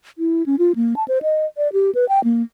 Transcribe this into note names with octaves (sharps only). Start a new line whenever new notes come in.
E4
C#4
F4
A#3
A5
C5
D#5
D5
G4
B4
G5
A#3